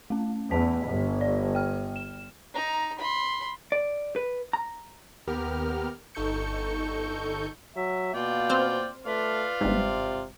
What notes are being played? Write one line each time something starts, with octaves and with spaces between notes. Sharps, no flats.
A3 C#4
E2 A5 B6
G1
D5
G5 F6
E7
D#4 A#5
B5 C6
D5
B4
A#5
D#2 B3 G4 A#4 F6
G1 D#4 A4 C#6 G6 C#7
F#3 E5
B2 A#3 F4 D5 G5
C4 C5 F6
A3 F4 B4 D5 F5
G1 G#2 C3